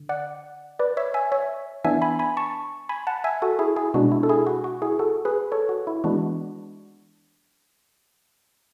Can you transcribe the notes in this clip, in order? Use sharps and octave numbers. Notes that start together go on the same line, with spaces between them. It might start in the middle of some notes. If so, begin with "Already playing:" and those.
Already playing: D3
D5 F#5
B4 D5
C#5 E5
E5 G#5
C#5 E5
E3 B3 D4 E5 G#5
G#5 B5
G#5 B5
A5 C#6
G#5 B5
F#5 A5
E5 G#5
F#4 A4
E4 G#4
E4 G#4
B2 G#3 D4 F#4
E4
A4
E4 G#4
F#4
F#4
E4 G#4
F#4 A4
G#4 B4
A4 C#5
F#4
E4
E3 G#3 B3 D4 F#4